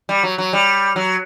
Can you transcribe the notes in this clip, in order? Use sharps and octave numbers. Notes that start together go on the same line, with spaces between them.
G3
F#3
F#3
G3
F#3